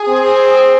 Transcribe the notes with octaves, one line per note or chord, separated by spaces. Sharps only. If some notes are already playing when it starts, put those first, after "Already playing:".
Already playing: G#4
C4